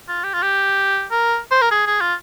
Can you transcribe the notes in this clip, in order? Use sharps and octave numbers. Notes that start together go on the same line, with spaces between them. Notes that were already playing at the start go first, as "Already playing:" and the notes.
F4
G4
F4
G4
A#4
C5
A#4
G#4
G#4
F4